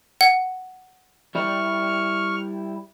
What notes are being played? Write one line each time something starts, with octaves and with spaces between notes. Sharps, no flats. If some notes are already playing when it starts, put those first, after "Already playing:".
F#5
G3 E4 C#6 F6